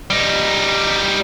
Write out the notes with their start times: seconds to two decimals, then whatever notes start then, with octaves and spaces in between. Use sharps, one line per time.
0.11 G3 D#4